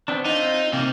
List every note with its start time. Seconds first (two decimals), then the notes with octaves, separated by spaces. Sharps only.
0.08 B3 C4 D4
0.25 C4 D#4 F4
0.73 C3 A#3 C4